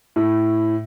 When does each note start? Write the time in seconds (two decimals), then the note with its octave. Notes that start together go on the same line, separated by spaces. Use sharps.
0.16 A2